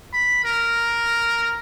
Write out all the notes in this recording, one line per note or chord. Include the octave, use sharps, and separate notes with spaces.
B5
A#4